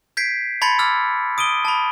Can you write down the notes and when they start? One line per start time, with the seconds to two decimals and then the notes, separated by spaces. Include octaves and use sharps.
0.17 G6 G#6 B6 C7 D7
0.61 A5 B5 C6 G#6 A6 C#7
0.79 D6 E6 F6 G#6 A6
1.38 D#6 D7 D#7 G7
1.65 A5 B5